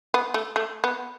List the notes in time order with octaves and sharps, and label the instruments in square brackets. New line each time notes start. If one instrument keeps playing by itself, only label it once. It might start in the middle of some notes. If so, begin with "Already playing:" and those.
[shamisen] B3
A3
A3
B3